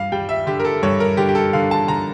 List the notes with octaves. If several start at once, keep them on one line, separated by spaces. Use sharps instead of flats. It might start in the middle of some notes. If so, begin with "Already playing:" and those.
Already playing: G2 G3 F5
G3 G5
E5
D3 G4
A#4
A4
G2 C#5
A#4
D3 G4
G4
A4
D3 F5
A5
D3 A#5